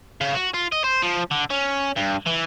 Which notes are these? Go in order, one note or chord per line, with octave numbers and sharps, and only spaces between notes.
C#3
F#4
F4
D#5
C5
F3
D3
C#4
G2
E3